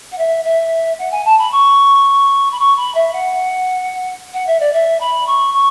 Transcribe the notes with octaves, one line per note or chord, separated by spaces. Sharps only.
F#5
E5
E5
F#5
G#5
A5
B5
C#6
B5
C#6
B5
E5
F#5
F#5
E5
D5
E5
B5
C#6
C#6